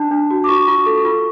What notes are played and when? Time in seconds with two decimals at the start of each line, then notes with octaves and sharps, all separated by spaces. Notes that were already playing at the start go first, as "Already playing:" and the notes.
Already playing: D4 A5
0.11 D4
0.31 F#4
0.44 D6
0.48 F4 C#6
0.67 F4
0.86 A4
1.05 F4